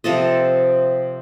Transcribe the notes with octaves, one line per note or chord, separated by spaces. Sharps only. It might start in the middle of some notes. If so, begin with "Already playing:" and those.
C3 F3 A4 D#5